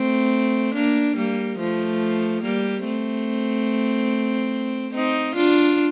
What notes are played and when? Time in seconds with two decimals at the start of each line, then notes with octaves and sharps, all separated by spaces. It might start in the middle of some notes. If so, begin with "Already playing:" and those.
Already playing: A3 C4
0.74 A#3 D4
1.16 G3 A#3
1.59 F3 A3
2.43 G3 A#3
2.85 A3 C4
4.94 C4 D#4
5.36 D4 F4